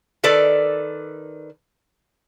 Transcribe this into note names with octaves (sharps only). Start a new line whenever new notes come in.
D#3 A4 B4 D5